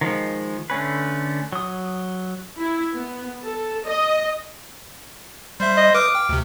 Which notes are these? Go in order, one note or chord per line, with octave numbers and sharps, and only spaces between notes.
D#3 F3 G#3
D3 A3 C#4 B4
F#3 D#6
E4
B3
A4
D#5
G3 C5 E5
D#5
B4 F5 D6 D#6
G5
D2 C3